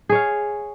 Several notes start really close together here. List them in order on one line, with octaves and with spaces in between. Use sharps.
G#4 C#5 F5